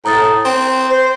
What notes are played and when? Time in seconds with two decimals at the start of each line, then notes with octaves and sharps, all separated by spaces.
0.05 A2 A#5 D#6 A6
0.45 C4 G5
0.90 C5